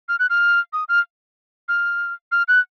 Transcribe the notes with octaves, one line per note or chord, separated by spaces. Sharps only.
F6
F#6
F6
D#6
F6
F6
F6
F#6